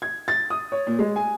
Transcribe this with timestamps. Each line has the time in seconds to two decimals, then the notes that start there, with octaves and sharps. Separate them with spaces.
0.02 G#6
0.28 A6
0.50 D#6
0.72 C#5
0.87 A#2
0.99 G#3
1.16 G#5